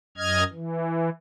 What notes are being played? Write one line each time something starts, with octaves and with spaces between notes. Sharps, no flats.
F#2 D#5 F6 G#6
E3